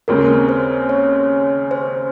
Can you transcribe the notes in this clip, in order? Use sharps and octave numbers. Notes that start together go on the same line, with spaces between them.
D#2 C#3 G#3 C4 A#4
C5
C#5
C5